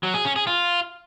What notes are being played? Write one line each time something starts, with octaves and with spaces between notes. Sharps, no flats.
F#3
G#4
C#4
G#4
F4